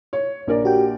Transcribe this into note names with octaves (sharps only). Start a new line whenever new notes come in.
C#5
A#1 A#4 D5
F#4 G4 G5